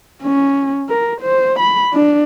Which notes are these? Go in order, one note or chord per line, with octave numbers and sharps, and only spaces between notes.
C#4
A#4
C5
B5
D4